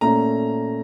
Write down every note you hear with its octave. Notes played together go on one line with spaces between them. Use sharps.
A#2 A3 C#4 A#5